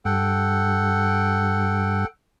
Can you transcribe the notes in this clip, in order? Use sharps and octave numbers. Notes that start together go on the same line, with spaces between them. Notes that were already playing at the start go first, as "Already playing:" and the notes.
G2 A4 F#5 G5